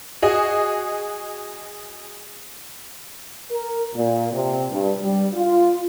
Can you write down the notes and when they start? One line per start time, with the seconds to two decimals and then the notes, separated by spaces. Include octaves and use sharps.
0.22 F#4 G#4 D#5
3.51 A#4
3.95 A#2
4.33 C3
4.70 G2
5.01 G3
5.34 F4